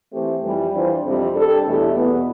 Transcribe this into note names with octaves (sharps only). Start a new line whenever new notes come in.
E3 A3 C4 G4 C5
F2 E3 G3
E3 G3 D4 F4 C5
F2 C3 G3
G3 D4 A4
E2 B2 A3 E4 G4
E2 B2 B3